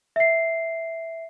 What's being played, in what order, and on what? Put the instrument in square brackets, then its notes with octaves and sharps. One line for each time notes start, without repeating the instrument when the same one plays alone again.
[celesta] E5 C7